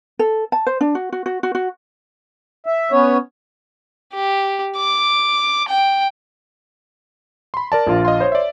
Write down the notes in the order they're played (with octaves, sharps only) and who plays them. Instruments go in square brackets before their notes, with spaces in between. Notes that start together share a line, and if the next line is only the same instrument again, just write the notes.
[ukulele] A4
A5
C5
D4
F#4
F#4
F#4
F#4
F#4
[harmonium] E5
B3 C#4 C#5
[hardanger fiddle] G4
D6
G5
[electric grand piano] B5 C6
A#4 D5 A5
[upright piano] A#1 F4
[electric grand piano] D#5 F5 C6
[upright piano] C5 C#5
[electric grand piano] D5 E5